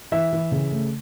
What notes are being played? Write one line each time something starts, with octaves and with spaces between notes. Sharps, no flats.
E3 E5
E3
C#3
A3